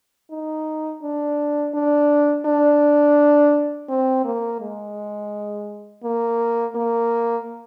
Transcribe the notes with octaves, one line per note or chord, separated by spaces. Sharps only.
D#4
D4
D4
D4
C4
A#3
G#3
A#3
A#3